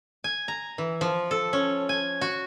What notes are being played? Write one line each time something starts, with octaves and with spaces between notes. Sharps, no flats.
G#5
A#5
E3
F3
A4
C#4
G#5
F#4